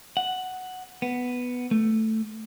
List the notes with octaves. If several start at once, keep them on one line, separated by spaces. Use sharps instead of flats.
F#5
B3
A3